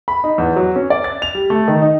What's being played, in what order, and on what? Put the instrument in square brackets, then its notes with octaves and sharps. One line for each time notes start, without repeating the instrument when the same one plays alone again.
[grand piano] B5
D#4
E2
F#3
C#4
D5
A6
F7
G3
A3
D#3
D#4